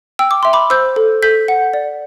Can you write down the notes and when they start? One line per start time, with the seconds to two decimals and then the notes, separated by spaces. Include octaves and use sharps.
0.19 G5 E6
0.31 D6
0.43 E5 C6
0.53 B5 D6
0.70 C5 E6 G6
0.96 A4
1.23 A4 G6 B6
1.48 F#5
1.74 D5